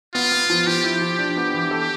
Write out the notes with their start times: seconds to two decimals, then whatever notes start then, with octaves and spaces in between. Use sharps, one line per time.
0.14 B3 F4
0.32 B3
0.50 F3
0.67 F3 G4
0.84 E4
1.02 F3
1.19 D4
1.36 B3
1.54 E3
1.71 A4